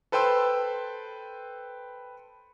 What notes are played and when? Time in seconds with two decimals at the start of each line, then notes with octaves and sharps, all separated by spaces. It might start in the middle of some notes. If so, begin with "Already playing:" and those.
0.12 A4 B4 C5 G5 C6 E6